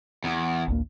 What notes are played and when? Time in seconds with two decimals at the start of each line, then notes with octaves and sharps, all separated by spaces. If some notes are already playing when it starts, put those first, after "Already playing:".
0.24 E2
0.68 A1 D2 A#3